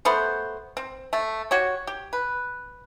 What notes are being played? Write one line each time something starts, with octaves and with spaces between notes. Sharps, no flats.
A3 B3 C5
C4
A3
F#4 G4 C#5
G4
B4